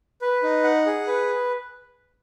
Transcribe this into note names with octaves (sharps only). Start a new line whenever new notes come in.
B4
D#4
F#5
G#4
B4